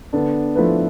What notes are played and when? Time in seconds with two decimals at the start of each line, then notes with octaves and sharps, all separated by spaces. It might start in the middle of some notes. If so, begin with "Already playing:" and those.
0.13 D3 B3 D4
0.55 F3 A3 E4 B4